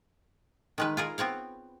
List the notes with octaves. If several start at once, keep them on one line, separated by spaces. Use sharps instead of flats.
D#3 G#3 B4
F4 G#4 A#4
B3 C4 C#5 F5